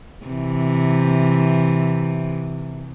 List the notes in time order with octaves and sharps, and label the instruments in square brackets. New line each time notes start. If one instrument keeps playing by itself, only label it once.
[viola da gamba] C3 E3